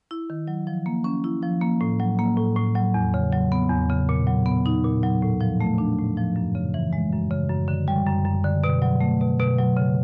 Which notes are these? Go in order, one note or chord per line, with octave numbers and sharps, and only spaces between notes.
E4
D#3
F#3
F3
A#3
C#4
E4
F3
A#3
A2
F#3
A#3
A2
A2
F#3
E2
C#3
F#3
B3
E2
C#3
A#2
F#3
B3
D#4
A#2
F#3
A2
F3
A3
D4
A2
F3
F#2
C#3
E3
G#3
F#2
C#3
F#2
D3
G3
F#2
F#2
D3
B2
F#3
A3
B2
B2
F#3
C#3